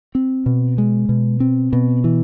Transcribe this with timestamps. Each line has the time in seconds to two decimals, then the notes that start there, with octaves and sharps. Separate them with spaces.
0.15 C4
0.46 B2
0.78 G#3
1.09 B2
1.40 C4
1.73 B2
2.04 E3